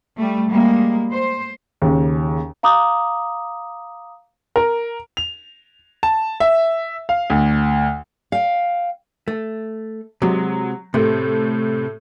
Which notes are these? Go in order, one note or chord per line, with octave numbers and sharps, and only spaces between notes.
G3 A3
G3 G#3 A#3
C5
D#2 C#3
F5 A#5 D6 D#6
A#4
F7
A5
E5
F5
D2
F5 G5
A3
C3 F#3 G#3
A2 C3 A3